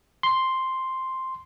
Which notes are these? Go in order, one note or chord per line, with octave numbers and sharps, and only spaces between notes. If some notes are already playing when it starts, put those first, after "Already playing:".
C6